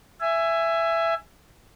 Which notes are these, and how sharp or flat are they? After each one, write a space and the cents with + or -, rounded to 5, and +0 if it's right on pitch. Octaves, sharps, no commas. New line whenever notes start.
E5 +15 G#5 +0